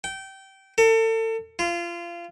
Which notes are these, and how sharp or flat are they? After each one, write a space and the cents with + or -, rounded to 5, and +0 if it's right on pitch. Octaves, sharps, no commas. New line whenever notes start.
G5 -20
A4 +35
F4 -25